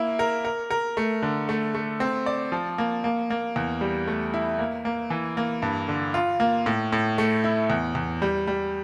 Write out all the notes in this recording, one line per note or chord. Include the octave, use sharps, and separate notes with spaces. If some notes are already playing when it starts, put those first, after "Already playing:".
Already playing: A#3 E4
A#4
A#4
A#4
A3
D3
A3
A3
C4
D5
F3
A#3
A#3
A#3
E2
G3
A3
E4
A#3
A#3
E3
A#3
G2
D3
F4
A#3
A2
A2
A3
E4
E2
E2
G3
G3